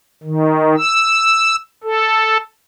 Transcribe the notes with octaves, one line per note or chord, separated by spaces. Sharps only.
D#3
E6
A4